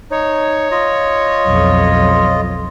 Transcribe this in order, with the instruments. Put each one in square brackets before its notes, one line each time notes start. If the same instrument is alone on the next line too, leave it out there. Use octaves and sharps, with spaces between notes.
[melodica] D#4 [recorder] C#5
[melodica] F4 D#5
[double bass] B1 F2